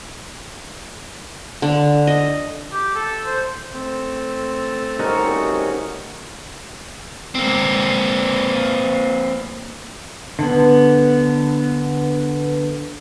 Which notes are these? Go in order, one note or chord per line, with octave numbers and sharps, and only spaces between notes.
D3
D#5
G4
A4
C5
A3 C4
C2 D#3 C#4 D#4 F#4
A#3 C4
D3 B3